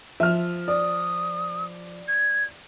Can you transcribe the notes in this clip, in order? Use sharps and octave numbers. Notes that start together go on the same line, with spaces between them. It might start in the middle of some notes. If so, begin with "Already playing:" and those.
F3 E5 F6
D5 D#6
G#6